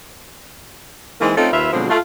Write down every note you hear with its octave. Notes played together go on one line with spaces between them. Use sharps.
E3 G#3 A#3 C4 D#4 E4
A3 C4 C#4 D#4 F4 A4
D#2 F4 B4 E5
B2 D3 F3 F#3 G#3 C4
A3 F4